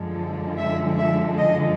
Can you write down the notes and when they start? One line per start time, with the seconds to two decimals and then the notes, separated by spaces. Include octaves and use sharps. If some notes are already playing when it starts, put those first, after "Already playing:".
Already playing: F#2 D3 F3 G#3
0.57 E5
0.97 E5
1.37 D#5